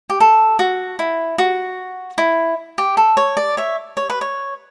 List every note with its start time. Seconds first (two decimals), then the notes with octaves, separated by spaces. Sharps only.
0.10 G4
0.20 A4
0.59 F#4
0.99 E4
1.38 F#4
2.18 E4
2.78 G4
2.97 A4
3.17 C#5
3.37 D5
3.57 C#5 E5
3.97 C#5
4.10 B4
4.21 C#5